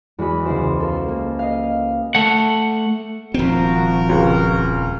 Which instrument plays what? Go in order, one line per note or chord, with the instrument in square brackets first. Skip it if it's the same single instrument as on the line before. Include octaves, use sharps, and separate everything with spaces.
[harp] E2 G#3 F#4 B5
C#2 G#3 E4 C5
A4 A#4 F5
A#3
D#5 F5
[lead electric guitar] A3 F#5
[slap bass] D#1 C4 [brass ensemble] F3 F#4 A#4
[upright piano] C#2